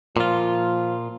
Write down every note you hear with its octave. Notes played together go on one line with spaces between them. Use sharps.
A#2 F3 F4